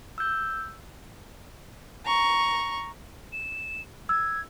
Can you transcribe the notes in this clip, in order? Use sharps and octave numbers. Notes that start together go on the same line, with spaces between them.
E6 F#6 G6
A#5 C#6
E7
E6 G#6